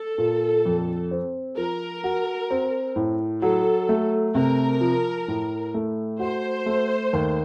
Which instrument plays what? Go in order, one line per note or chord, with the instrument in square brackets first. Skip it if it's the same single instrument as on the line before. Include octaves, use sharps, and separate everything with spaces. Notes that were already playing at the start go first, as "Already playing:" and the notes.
Already playing: [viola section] A4
[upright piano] A#2
F2
C4
[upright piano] F3 [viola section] A#4
[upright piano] F#4
C4
A2
[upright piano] F#3 [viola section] A4
[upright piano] A3
[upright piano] C3 [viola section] A#4
[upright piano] F3
A2
A3
[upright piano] F#4 [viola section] C5
[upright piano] A3
D#2